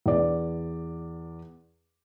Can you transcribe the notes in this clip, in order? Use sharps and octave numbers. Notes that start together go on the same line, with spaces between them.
E2 D5